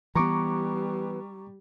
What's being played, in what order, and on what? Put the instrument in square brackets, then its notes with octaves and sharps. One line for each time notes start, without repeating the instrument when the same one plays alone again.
[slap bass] E3 B3 [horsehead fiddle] G3 [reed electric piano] A#5 C#6 D6